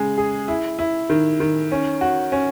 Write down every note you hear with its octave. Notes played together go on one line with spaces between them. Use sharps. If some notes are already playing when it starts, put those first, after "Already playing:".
Already playing: C#3 G#3
G#4
E4
E4
D#3
D#3
C#4
F#4
C#4